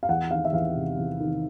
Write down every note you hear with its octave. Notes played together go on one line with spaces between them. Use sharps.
F5
E2 F#5
D#3 F5
E5
E2 F5
C3
E2
D#3